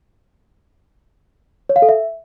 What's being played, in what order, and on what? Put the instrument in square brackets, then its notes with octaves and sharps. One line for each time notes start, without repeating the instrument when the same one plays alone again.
[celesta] C#5
F5
A4
E5